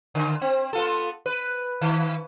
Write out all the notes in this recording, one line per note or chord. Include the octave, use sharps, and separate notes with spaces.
D3
C4
B3 F4 A4
B4
D#3